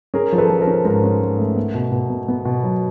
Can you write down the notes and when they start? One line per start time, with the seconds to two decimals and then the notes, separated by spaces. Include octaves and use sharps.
0.14 C#4 G#4 A#4
0.32 F3
0.38 A4 B4
0.50 F3
0.61 A#4 C5
0.67 C#4
0.85 G#2 A#4 C5
1.04 C#4
1.21 G#2
1.38 A3
1.56 B3
1.74 B2
1.92 B2
2.10 B3
2.28 B3
2.45 B2
2.63 F#3